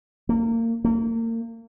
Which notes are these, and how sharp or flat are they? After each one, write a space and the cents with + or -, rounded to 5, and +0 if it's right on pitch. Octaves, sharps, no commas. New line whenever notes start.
A#3 -30
A#3 -35